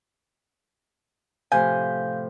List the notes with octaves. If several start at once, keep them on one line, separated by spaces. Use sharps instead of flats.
A2 C3 F3 F5 G#5 G6